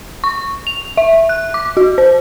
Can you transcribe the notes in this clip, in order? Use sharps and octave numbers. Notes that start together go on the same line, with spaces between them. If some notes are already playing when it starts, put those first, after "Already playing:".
C#6
F7
E5
F#6
D6
F#4
C5